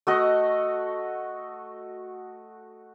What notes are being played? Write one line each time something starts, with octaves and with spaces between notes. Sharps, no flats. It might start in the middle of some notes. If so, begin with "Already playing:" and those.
A3 F#4 D#5